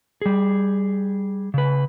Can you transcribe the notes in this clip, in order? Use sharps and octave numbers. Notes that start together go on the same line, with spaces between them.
G3 G#4
C#3 B4